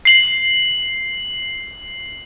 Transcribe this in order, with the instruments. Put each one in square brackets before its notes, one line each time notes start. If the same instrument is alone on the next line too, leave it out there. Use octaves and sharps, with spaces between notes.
[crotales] C7 F#7